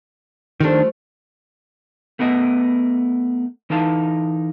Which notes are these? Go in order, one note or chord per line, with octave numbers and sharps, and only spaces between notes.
D#3 F3 G3 A3 D4
A3 B3 A#4 D#5
E3 D#4 A4 F5 A5